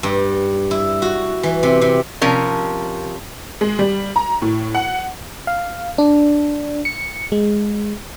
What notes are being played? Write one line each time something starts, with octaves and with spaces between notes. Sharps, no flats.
G2
E4
F#4
E3
C3
C3
C3 F3 C#4 A#4
G#3
G3
A#5
A2
F#5
F5
D4
C#7
G#3